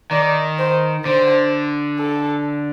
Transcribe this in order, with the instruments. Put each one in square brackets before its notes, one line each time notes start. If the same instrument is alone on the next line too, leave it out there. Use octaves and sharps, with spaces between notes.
[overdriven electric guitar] D#3 [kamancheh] D5
[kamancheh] C5
[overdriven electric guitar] D3 [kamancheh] C5
[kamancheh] A4